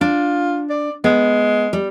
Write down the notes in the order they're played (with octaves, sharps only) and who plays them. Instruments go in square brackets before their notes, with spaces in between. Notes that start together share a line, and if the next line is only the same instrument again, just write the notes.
[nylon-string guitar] D4 [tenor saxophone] F4
[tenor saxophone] D5
[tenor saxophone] G#3 [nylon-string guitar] B3
[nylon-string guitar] G3